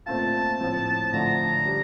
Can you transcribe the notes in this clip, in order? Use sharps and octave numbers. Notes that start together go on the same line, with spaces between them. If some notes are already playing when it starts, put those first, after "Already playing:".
A#2 A3 C4 F4 A5
A2 F3 C4
D3 F3 A3 D4 A#5
G3 D4 G4